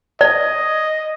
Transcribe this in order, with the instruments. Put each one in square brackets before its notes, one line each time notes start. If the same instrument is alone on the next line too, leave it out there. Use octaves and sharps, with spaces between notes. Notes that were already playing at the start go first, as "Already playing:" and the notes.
[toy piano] D5 [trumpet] D#5